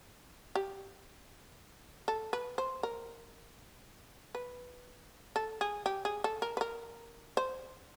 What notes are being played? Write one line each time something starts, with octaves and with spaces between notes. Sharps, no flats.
G4
A4
B4
C5
A#4
B4
A4
G#4
G4
G#4
A4
A#4
B4
A#4
C5